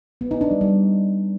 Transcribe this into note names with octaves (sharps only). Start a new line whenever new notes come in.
B3
D#4
D4
G3
G3